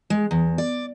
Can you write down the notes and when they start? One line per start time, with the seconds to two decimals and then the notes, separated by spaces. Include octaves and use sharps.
0.10 G#3
0.31 E2
0.58 D5